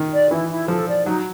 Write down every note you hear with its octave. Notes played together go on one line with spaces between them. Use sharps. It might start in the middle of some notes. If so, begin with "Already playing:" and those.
Already playing: D#3
D5
E3 E4
E4
F3 A4
D5
F#3 D#4